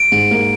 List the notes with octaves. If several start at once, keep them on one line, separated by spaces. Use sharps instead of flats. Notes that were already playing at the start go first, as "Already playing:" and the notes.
Already playing: D7
G#2
A#3